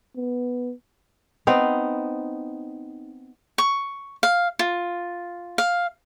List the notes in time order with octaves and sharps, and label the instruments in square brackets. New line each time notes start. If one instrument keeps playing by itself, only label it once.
[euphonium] B3
[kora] B3 C4 D#4
[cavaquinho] C#6
F5
F4
F5